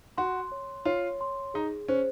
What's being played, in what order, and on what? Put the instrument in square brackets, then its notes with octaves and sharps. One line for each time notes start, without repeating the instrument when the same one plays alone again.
[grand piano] F#4 [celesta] C6
[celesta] C#5
[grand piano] F4 [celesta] C#5
[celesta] C6
[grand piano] D#4 [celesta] G#4
[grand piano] C#4 [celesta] C5